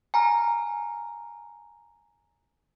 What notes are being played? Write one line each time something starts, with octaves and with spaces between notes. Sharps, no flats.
G#5 A#5 F6